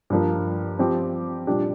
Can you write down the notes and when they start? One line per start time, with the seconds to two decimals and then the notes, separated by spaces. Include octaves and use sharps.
0.10 G2 F3 A#3
0.79 F3 C4 G4
1.47 A#2 G3 D4 G4